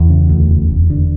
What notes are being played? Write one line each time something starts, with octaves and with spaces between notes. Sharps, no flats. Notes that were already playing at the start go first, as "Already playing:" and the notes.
Already playing: E2
C#3
D2
F1
F1
D3